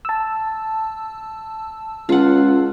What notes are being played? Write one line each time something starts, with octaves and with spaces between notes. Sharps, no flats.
A5 E6
C#2 F4 F#5